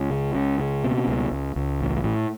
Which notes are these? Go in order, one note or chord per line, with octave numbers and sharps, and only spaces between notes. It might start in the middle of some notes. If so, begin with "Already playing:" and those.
Already playing: C#2
C#3
C#2
C#3
B2
C#2
C#2
C#2
A1
A2